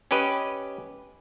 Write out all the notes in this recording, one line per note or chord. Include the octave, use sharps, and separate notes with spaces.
C#4 G4 B4 D#5